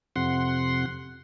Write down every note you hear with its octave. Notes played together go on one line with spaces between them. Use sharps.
F2 C3 F#5 C6